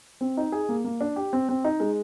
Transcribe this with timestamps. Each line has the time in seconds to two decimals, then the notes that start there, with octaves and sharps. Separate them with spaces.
0.21 C4
0.37 D#4
0.52 G#4
0.69 A#3
0.84 A#3
1.01 D4
1.16 G4
1.33 C4
1.49 C4
1.64 D#4
1.80 G#3